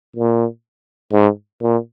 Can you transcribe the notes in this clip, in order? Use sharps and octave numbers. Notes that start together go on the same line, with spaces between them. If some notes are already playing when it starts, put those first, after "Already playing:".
A#2
G#2
A#2